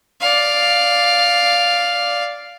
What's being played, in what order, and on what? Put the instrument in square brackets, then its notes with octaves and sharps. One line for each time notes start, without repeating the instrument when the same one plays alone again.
[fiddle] D5 F5